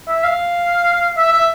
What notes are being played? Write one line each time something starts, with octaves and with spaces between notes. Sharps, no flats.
E5
F5
E5
E5